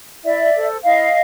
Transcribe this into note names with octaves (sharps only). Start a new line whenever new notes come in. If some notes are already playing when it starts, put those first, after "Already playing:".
E4 D5 E5
A4 C5
E4 D#5 F5